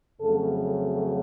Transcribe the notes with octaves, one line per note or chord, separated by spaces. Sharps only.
F2 C#3 F#3 A3 A4